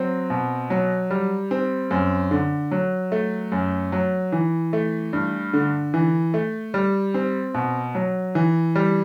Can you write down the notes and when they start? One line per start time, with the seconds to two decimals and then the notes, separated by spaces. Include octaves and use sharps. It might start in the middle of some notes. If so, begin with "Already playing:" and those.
Already playing: F#3 C4
0.30 B2
0.70 F#3
1.11 G3
1.51 C4
1.91 F#2
2.31 D3
2.71 F#3
3.12 A3
3.52 F#2
3.92 F#3
4.32 E3
4.73 A3
5.13 G2
5.53 D3
5.94 E3
6.34 A3
6.74 G3
7.14 C4
7.54 B2
7.95 F#3
8.35 E3
8.75 G3